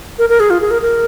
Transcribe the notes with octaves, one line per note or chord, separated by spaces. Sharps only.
A#4
A#4
G#4
F4
G#4
A#4
A#4